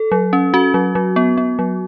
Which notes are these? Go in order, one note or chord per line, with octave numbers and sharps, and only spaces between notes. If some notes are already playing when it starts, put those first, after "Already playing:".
Already playing: A4
F#3
C#4
C#4 F#4
F#3
F#3
B3
B3
F#3